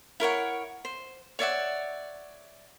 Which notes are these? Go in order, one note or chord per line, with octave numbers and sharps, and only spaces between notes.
E4 A#4 C#5 F#5
C5
C#5 D5 E5 F#5